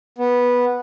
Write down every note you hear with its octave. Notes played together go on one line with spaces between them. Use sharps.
B3